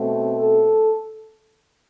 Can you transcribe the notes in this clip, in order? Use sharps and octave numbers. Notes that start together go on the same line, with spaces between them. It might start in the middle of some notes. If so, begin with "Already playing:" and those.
Already playing: B2 A3 C4
A4